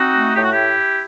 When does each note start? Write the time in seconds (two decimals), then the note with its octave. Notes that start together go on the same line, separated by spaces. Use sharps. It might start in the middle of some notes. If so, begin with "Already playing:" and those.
Already playing: C4 D#4 F#4
0.15 A3
0.36 A2 G4
0.44 F#4
0.53 E4 G4